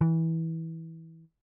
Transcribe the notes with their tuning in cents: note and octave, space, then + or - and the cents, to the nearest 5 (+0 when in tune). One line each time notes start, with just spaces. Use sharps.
E3 -20